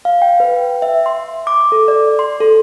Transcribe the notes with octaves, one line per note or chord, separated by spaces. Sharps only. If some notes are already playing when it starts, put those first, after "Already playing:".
F5
G5
B4
E5
C6
D6
A4
D5
C6
A4